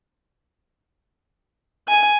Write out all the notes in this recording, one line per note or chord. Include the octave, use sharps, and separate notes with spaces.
G#5